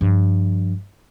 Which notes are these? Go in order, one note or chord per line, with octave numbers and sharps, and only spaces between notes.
G2 F3